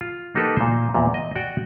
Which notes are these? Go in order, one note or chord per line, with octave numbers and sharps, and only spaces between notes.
F4
A#3 D#4 F#4 G4 A4 B4
A#2 C5
E2 A#2
D#5
F#4 D5 G5